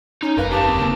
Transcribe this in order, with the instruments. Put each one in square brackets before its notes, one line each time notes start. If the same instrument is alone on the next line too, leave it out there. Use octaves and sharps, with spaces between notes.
[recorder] C#4 [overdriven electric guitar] D#4
[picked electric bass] F#1 F#2 [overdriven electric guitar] A#4 F5 [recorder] B4
[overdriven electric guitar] G4 A#4 [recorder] A5
[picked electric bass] E1 C4
C#3 A#3